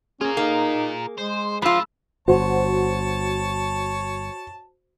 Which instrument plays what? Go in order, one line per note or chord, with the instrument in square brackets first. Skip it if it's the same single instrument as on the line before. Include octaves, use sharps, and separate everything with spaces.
[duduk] C#4 [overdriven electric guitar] F4 A#4 [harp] G#4
[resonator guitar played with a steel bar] A#3 [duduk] D#4
[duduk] G#3 [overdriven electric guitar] C5
[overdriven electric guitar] G#2 A5 [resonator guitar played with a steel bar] F3 F4 [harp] B5 E6
[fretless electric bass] G1 [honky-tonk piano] F#4 C5 [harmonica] C#5 A5